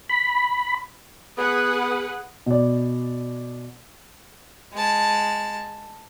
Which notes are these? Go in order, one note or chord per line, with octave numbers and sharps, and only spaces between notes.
B5
B3 G#4 B4 F#5
B2 D5
G#3 A5